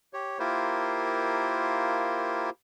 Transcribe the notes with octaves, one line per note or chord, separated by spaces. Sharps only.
G4 C#5
A#3 E4 F4 G4 A#4 C5